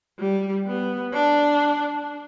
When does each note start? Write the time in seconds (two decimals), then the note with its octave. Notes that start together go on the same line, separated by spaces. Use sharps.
0.19 G3
0.66 B3
1.13 D4